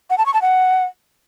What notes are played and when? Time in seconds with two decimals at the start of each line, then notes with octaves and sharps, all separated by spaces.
0.10 F#5
0.18 A5
0.26 C#6
0.34 A5
0.42 F#5